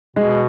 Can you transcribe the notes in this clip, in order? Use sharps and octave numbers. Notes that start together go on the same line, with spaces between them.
B2 G#3